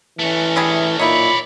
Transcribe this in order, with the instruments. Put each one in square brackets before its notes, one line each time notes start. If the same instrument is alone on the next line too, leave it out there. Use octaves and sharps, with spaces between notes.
[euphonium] E3 [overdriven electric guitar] A3 C#4
[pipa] D3 G3 G#4
[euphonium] A#2 [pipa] D#4 E4 [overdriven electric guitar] C#5 D5 [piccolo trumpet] B5